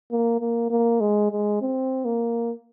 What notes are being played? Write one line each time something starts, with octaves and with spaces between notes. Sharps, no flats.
A#3
A#3
A#3
G#3
G#3
C4
A#3